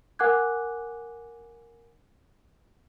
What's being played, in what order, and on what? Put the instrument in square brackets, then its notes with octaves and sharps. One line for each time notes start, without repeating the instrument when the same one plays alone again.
[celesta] A#4 F#5 G#5 D6 F#6 G#6